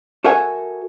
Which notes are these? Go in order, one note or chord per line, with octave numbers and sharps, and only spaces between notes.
F#4 A4 A#4 E5 F#5 G#5